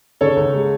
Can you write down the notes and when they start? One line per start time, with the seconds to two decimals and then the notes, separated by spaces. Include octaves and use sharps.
0.21 C#3 A4 C#5
0.37 C#2
0.53 G#3